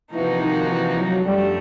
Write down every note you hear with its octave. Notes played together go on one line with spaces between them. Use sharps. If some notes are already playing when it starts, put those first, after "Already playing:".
C3 E3 F3 A#3 D#4 F#4
D#3
E3
F#3
F#2 D3 F3 G3 A3